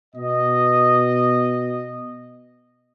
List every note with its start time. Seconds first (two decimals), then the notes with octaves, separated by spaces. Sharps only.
0.15 B2 D#5